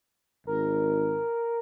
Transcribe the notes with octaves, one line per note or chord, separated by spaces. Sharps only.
G#1 A#4